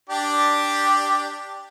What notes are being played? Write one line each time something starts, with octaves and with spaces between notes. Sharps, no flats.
D4 G4 D5